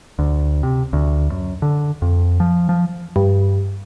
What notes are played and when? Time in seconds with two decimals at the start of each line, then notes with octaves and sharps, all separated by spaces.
0.19 D2
0.63 C3
0.93 D2
1.32 F#2
1.62 D3
2.02 F2
2.40 F3
2.69 F3
3.16 G2